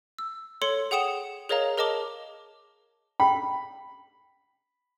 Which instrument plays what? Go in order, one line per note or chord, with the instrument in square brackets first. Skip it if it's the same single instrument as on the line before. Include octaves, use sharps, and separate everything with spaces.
[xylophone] E6
A4 C#5 C6 C#7 G7
G#4 F#5 G5 D#6 C#7 E7
G#4 A#4 C#5 D#5 F5 A#5
G#4 A#4 D#5 A5 D6 G7
[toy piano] G5 [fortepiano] B5